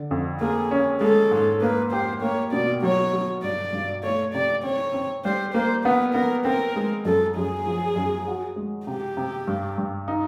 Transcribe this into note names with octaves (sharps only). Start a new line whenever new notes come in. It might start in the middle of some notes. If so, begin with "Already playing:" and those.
Already playing: D3
F2
A#3 G#4
C#4
G#3 A4
G#2
A#3 B4
G4 C5
A#3 C#5
B2 D5
F#3 C#5
F#3
G2 D5
G2
A3 C#5
C3 D5
C4 C#5
C4
G3 C5
A#3 C5
B3 B4
B3 A#4
C4 A#4
G#3
F#2 A4
F#2 G#4
F3
F#2
F#4
G#3
C3 G4
C3
G2
G2
D#4